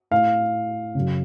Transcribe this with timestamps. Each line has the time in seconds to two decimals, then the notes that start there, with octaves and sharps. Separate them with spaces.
0.11 A2 F5
0.95 F#2 C#3